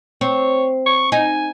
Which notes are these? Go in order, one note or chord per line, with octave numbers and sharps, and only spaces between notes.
C4 C#5
C#6
D#4 G#5